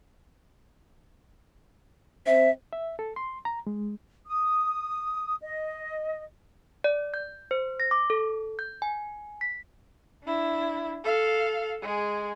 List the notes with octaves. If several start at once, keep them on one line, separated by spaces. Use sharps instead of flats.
C4 E5
E5
A4
C6
A#5
G#3
D#6
D#5
D5
G6
C5
A#6
D6
A4
G6
G#5
B6
D4 E4
A4 F5
G#3 G#4